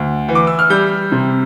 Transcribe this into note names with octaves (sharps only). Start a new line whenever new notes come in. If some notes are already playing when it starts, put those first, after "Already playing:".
Already playing: D2
E3
D6
E6
F6
G3 G6
C3